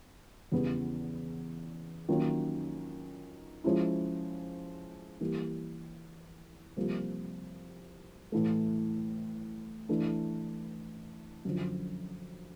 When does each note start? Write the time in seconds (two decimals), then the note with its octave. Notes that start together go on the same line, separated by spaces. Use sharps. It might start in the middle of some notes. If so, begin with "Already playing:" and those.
0.52 E2 C#3 E3 G3 B3
2.09 D#3 F#3 A#3 C#4 F4
3.64 F3 G#3 C#4 E4
5.20 E3 G3 A#3
6.76 C2 C3 F3 A#3
8.32 A2 E3 A3
9.89 E3 A3 D4
11.45 F#2 D3 F3